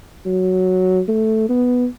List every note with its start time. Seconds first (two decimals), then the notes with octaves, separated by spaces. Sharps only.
0.26 F#3
1.08 A3
1.49 B3